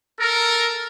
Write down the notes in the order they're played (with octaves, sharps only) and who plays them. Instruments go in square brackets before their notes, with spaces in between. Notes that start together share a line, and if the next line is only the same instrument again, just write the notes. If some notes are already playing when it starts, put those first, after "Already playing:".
[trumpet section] A4 A#4